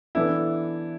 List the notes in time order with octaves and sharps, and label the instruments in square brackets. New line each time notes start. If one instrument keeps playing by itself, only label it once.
[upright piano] E3 B3 D4 A4 [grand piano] E4